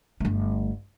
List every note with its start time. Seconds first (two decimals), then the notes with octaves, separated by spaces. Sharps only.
0.20 G1 A3